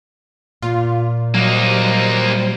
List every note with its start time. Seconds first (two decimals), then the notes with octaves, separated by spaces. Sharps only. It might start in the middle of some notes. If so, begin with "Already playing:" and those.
0.62 A#2 F4
1.34 F#3 G3 A#3 D#4 C5